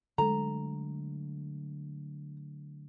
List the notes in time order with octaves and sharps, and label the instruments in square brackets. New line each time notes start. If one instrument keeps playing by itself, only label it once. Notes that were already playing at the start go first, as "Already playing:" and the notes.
[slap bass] D3 F#3 A3 [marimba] G#3 A4 [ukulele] A#5